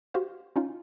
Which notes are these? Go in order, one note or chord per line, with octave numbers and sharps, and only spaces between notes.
F#4 G4 C5 F5
C#4 D#4 F4 F5